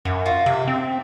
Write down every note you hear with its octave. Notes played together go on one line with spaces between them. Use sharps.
F#2 F#4
F4 F#4
C3 E5
C4